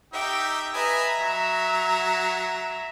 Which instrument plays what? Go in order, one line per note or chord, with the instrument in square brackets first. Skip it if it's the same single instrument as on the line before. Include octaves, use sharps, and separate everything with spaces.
[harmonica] D#4 G4 E5 [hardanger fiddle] G5
[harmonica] B4 D#5 G#5 [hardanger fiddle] E5 A#5
[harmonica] F#3